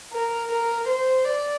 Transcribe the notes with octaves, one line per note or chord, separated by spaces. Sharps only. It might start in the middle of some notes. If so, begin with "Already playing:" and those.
A#4
A#4
C5
D5